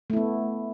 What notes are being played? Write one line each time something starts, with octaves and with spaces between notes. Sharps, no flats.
A3 B3 E4